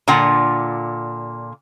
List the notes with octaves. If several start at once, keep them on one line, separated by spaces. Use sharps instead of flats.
A#2 D3 F4 F#5